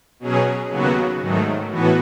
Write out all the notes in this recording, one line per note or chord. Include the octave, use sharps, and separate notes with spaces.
B2 F#3 C#4 G#4
D#2 C#3 F#3 B3 F#4
G#2 D#3 F#3 A3
A2 E3 B3 F#4